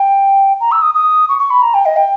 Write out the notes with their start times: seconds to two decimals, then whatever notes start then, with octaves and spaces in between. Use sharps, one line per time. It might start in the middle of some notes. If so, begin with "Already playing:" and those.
Already playing: G5
0.60 A#5
0.72 E6
0.82 D#6
0.94 D#6
1.29 C#6
1.39 C#6
1.50 B5
1.62 A#5
1.74 G5
1.86 D#5
1.96 G5